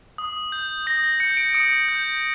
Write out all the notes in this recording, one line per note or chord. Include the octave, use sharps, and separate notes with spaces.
D#6
G6
D#6 A#6
A#6
G6 C#7
D7
D#6 C#7
G6